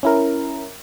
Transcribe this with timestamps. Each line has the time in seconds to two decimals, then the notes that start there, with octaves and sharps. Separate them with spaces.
0.03 C#4 E4 A#4